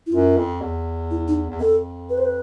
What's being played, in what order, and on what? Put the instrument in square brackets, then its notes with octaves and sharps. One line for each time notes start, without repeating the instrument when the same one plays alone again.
[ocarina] E4
[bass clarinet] F#2 [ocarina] F4
[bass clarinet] F2
E2
[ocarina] E4
D#4
[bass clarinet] E2
[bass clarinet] F2 [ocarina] A4
[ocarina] B4
C5
B4